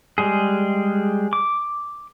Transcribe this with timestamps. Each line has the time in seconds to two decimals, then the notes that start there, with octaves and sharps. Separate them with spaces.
0.18 G3 G#3 G#4
1.33 D6